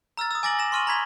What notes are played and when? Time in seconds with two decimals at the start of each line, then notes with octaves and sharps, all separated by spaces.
0.17 A#5 E6 F6 A6
0.31 D#6 E6
0.43 G#5 D6 A6 A#6 D7 F#7
0.59 A#6 E7
0.72 C6 C#6 F6 D#7 F#7
0.87 A#5 B5 G#6 B6 F7 G7